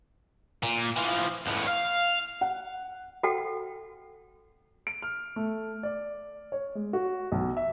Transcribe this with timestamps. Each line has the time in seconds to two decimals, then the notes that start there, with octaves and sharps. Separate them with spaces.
0.63 A#2
0.96 E3 F3
1.46 C#2 A2
1.67 F5
2.41 F#5
3.23 F#4 A4 F#5 G5
4.87 D7
5.02 F6
5.36 A3
5.83 D5
6.52 C#5
6.75 G#3
6.93 F#4
7.32 B1
7.57 E5